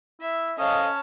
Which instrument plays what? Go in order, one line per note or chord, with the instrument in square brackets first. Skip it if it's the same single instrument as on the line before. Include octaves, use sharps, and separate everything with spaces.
[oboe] E4 [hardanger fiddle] E5
[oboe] C#4 [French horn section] A4 C5 D#5 [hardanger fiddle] C#5 A5 [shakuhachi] F5